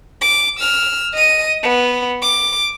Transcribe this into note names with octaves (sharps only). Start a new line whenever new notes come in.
D6
E6 F6
D#5 D#7
B3
D6